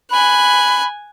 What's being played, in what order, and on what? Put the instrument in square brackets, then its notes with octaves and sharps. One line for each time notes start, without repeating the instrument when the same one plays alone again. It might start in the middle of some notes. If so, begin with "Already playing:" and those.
[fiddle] G#5 F#6 [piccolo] B5